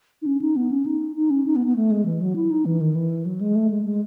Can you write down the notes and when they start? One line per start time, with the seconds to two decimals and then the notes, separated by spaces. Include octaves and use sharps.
0.22 D#4
0.26 C#4
0.41 D#4
0.56 B3
0.71 C#4
0.86 D#4
1.16 D#4
1.30 C#4
1.46 D#4
1.56 B3
1.66 B3
1.76 A3
1.91 G#3
2.06 E3
2.21 F#3
2.36 E4
2.51 D#4
2.65 E3
2.81 D#3
2.95 E3
3.25 F#3
3.41 G#3
3.55 A3
3.70 G#3
3.85 G#3